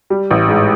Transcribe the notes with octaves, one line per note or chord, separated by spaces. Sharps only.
G3
A1
G#2